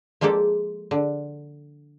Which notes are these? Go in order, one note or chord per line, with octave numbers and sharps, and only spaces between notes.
F3 G#3 A#3 G4 A4
D3